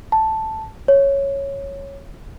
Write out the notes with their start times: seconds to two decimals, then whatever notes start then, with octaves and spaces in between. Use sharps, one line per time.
0.12 A5
0.88 C#5